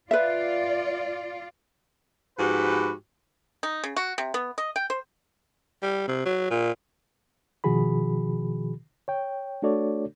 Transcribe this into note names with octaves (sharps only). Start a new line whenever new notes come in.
F4 B4 D5 E5
G#2 F3 F#4 G4 B4
D#4
C#3
F#4
C3
B3
D#5
G5
C5
G3
C3
F#3
A#2
B2 D#3 F3 F#4 G#4 B5
C#5 G5
A3 D4 F#4 A4 C#5 D5